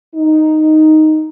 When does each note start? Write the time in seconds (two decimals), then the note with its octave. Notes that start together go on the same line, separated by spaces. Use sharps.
0.15 D#4